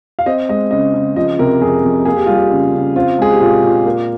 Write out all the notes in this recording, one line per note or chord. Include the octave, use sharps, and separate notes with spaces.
F5
C4 D#5
G#3 D#5
C#3 D#5
C#3
F3 D#5
C3 A#4
F2 G#4
F2
A#3 G#4
G4
G3 F4
G4
C#3
C#3
C4 F4
G#3 G#4
G4
A#2 F4
A#2
A#3